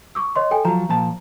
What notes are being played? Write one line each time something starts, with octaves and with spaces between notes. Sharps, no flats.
C#6 D6 E6
C#5 D#5 C6
A4 G5 G#5
F3 F#3 A#5
A#2 F3 A5